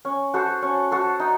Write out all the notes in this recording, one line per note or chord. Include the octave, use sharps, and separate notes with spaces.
C#4
F#4 A4 C5
C#4
F#4 A4 C5
D#4